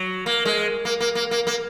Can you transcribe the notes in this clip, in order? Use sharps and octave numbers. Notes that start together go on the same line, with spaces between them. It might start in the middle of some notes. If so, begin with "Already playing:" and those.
Already playing: F#3
A#3
G#3
A#3
A#3
A#3
A#3
A#3